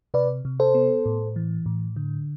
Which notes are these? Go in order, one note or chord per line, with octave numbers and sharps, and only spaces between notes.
C3 B4 D5
C3
A4 C5
B3
A2
E3
A2
D3